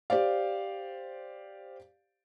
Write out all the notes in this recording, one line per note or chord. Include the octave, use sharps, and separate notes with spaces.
G4 C5 D5 F5